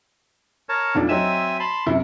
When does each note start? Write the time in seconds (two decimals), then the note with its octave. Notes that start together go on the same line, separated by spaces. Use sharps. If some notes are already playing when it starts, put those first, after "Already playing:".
0.69 A#4 C#5 A5
0.95 B1 F2 D4
1.09 F#3 C4 D#5 E5 G#5 E7
1.60 A5 B5 C6
1.86 F#2 C3 E4